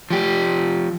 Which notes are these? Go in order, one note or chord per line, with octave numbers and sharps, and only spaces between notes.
F3 G4